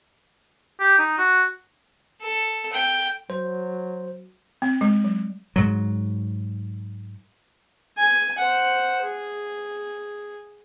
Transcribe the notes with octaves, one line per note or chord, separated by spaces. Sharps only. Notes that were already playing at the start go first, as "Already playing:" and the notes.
G4
D#4
F#4
A4
G5
F#3 C5
C4
G#3
F#3
G#2 F#3
G#5
C5 F#5
G#4